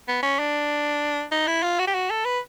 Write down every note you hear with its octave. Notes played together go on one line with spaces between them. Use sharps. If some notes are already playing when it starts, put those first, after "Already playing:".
B3
C#4
D4
D#4
E4
F4
F#4
G4
F#4
A4
B4